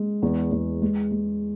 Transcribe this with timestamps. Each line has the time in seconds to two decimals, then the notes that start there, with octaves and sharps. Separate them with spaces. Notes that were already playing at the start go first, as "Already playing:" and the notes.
Already playing: G#3
0.22 E2
0.52 E2
0.82 G#3
1.11 G#3